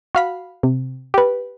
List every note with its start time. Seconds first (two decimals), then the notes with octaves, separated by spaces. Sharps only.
0.15 F#4 F5 B5
0.63 C3
1.14 G4 B4